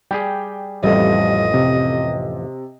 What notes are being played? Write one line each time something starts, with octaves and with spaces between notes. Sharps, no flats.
G3 G4 G#4 G5
A1 F2 G3 A4 D#5
C3